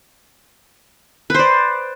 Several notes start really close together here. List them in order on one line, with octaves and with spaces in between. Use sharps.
B4 C5 D5